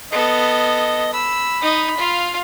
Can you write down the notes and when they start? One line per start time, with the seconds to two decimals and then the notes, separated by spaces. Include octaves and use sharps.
0.12 B3 A4 D#5
1.13 B5 E6
1.62 D#4 D#5
1.97 F4 F5